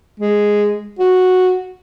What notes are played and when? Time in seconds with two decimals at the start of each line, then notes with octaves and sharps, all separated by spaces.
0.20 G#3
0.99 F#4